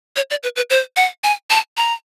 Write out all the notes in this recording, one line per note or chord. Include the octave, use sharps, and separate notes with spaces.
C#5
D5
B4
B4
C5
F#5
G#5
A5
A#5